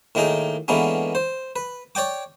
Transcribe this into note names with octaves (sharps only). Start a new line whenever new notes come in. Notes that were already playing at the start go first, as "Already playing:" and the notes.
A2 D#3 A#3 D#4 G#4
D3 E3 G#3 A#3 B3 C#4
C5
B4
C#5 D5 G5 D6